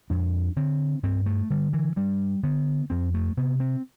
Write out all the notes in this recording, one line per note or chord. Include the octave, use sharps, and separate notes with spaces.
F2 D4
D3 C4
G2 C4
A3
D3 G3
E3
G2 G3
D3 B3
F2 C4
A3
C3 B3
C4